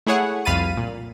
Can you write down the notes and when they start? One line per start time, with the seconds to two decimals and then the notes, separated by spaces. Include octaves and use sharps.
0.07 A3 E4 G#4 C#5 F#5
0.45 C2 F2 F5 B5 A6 D#7
0.77 A#2